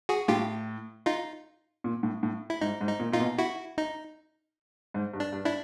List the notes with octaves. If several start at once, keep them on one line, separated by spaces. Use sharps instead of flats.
F#4 G#4
A2 F4 G4
D#4 F4
A#2
A2
A2
E4
G#2 D#4
G#2
D#4
A#2
A#2 D#4 F4
B2
E4 F#4
D#4
G#2
G2
D4
G2
D4 E4